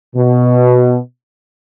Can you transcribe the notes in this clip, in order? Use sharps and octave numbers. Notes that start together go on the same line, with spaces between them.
B2